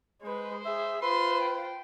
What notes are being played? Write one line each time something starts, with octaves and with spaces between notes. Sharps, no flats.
G#3 B4 C5
G#4 E5
F4 B4 C5 C6
G5